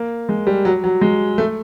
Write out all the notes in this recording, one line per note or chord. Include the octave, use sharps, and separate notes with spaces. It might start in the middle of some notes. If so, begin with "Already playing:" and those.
Already playing: A#3
G#3
G3
F#3
F#3
G#3
A3